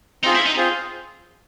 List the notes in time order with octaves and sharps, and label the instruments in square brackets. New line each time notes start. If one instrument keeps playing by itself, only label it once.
[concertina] C4 F4 G#4 C5 [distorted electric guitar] D#4
[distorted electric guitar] E4
D#4
[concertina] C4 F4 G#4 C5